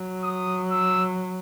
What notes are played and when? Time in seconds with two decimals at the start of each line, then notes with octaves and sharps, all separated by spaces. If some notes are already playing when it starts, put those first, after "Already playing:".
Already playing: F#3
0.23 D#6
0.71 E6